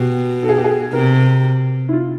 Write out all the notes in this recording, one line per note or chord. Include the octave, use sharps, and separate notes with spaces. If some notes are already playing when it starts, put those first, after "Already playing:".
Already playing: B2 G4
A4
G#4
G4
G#4
C3 A#4
E4
F4